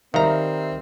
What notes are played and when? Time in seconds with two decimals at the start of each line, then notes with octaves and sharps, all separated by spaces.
0.14 D#3 G3 C4 E5 F5 A#5